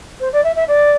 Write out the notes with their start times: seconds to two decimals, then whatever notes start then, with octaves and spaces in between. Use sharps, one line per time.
0.20 C5
0.32 D5
0.44 E5
0.55 E5
0.68 D5